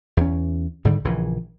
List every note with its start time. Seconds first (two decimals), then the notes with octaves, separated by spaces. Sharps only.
0.17 E2 C#4
0.85 G#2 D3 D#3 G3
1.05 A#1 C#3 E3